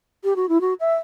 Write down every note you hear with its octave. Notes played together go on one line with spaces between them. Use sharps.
G4
F#4
E4
F#4
E5